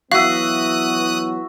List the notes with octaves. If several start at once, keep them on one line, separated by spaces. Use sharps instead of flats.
E3 F#3 B3 F#4 E5 F5 D#6 F#6